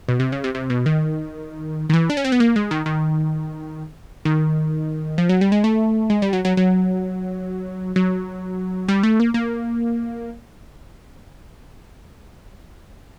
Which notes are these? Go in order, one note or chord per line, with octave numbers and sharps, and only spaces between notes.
B2
C3
C#3
C3
C3
B2
D#3
D#3
E3
D4
C#4
C4
B3
A#3
G#3
D#3
D#3
D#3
F3
F#3
G3
G#3
A3
G#3
G3
F#3
F#3
F#3
F#3
G3
A3
A#3
A#3